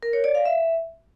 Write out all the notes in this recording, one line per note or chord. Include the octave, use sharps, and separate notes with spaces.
A#4
C#5
D5
F5
E5